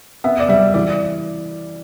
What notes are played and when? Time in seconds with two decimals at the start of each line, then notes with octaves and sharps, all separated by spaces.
0.24 B3 E5
0.40 D5
0.48 G3 E5
0.74 E3 D5